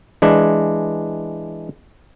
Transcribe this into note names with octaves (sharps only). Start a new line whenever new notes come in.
E3 G#3 D4